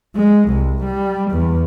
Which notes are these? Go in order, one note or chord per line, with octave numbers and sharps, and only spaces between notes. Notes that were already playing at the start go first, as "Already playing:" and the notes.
G#3
C2
G3
E2